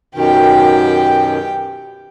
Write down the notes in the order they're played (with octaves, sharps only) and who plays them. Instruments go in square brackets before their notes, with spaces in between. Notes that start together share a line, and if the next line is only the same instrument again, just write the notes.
[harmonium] F#2 B2 D#3 [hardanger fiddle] G4 G5